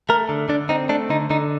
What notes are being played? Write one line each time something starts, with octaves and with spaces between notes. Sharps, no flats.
A3 A#4
D3
D3 D4
C4 D#4
A3 D4
D3 D#4
D3 D#4